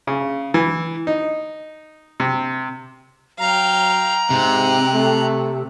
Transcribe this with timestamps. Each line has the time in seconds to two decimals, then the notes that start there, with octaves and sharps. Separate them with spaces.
0.07 C#3
0.54 E3
1.07 D#4
2.20 C3
3.40 F#3 F5 G5 A#5
4.30 G#2 C3 F#6
4.94 A3